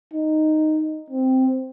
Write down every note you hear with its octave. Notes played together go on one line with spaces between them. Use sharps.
D#4
C4